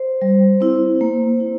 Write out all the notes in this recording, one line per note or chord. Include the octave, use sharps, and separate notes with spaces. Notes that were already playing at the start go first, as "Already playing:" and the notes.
Already playing: C5
G3
C4 E4
A#3
E4